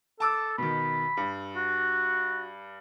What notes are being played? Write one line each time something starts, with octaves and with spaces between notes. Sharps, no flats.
A4 A5 D6 E6
B2 D#3 B5
G2
F#4